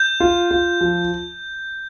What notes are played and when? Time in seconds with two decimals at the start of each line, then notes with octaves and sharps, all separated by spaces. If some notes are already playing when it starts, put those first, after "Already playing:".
Already playing: G6
0.20 F4
0.51 F4
0.81 F3